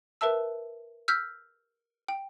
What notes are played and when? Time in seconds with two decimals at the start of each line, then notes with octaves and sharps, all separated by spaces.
0.21 A#4 B4 E5 A5 E6
1.08 E6 F6 G6 B6
2.08 G5